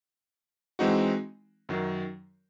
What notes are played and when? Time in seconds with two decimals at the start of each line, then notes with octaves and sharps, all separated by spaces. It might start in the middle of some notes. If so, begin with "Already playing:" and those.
0.79 E3 G#3 C4 D#4 F#4
1.69 F#2 D#3 F#3